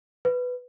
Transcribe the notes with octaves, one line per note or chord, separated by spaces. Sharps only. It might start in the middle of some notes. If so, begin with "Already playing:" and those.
B4